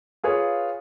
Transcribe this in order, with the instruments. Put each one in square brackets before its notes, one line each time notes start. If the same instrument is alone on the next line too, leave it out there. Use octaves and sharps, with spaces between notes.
[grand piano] F4 G#4 B4 C#5 F5